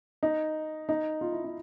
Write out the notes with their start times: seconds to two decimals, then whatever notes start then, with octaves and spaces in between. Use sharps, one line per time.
0.23 D#4
0.89 D#4
1.21 F4
1.32 E4
1.44 D#4